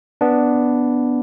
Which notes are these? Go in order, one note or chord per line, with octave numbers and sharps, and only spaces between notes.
B3 D4